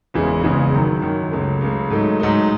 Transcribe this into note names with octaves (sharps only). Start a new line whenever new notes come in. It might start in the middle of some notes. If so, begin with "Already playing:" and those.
F#1 E2 C#3 E3 G#3
F#1 E2 C#3 E3 G#3
F#2 D#3 F#3
F#2 D#3 F#3
C#2 C#3 F#3 A3
C#2 C#3 F#3 A3
G#2 F#3 A3 D#4
G#2 F#3 A3 D#4